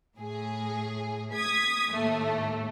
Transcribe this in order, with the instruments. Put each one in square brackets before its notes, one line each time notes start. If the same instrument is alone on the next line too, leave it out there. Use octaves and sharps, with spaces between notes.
[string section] A2 G#4
D#6 G#6 B6
D#2 A2 A3 A#3